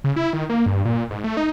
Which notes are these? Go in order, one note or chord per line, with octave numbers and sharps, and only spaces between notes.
C#3
E4
D#3
A#3
G2
A#2
G#2
A3
D#4